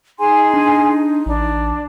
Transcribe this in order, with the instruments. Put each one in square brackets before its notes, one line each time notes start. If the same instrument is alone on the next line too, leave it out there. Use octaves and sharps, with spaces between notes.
[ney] D#4 [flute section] G#4 G#5 C6
[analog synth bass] D4
[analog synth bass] A1 [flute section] D4